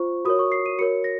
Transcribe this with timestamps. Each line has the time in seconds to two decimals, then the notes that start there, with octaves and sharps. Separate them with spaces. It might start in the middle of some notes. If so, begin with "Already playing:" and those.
Already playing: F4 C5 C#6
0.25 F#4 A#4 C#5 D#6
0.39 C#6
0.52 C7
0.66 D#7
0.79 F#4 A#4 C#5 C#7
1.04 A#6